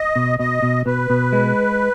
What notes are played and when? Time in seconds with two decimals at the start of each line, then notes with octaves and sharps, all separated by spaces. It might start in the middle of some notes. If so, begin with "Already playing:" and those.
Already playing: D#5
0.16 B2
0.39 B2 D#5
0.62 B2
0.86 B2 B4
1.10 B2
1.33 G#3